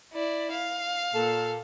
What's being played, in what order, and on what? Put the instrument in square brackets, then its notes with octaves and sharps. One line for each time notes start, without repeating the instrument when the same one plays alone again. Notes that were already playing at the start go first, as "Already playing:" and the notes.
[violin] E4 D5
F5
[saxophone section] A#2 A4